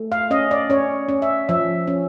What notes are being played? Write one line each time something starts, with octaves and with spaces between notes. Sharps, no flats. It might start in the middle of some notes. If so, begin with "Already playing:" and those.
Already playing: A3
F5
C#4 D#5
D5
C#4 C#5
C#4
E5
F3 E5
C#4